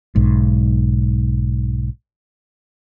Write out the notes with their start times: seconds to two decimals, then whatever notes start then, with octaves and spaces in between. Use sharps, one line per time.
0.16 B1 G#2